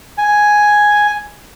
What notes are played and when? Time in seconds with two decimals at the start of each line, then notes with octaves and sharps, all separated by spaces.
0.18 G#5